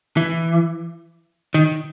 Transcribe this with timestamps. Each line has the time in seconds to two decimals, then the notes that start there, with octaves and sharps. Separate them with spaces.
0.17 E3
1.54 D#3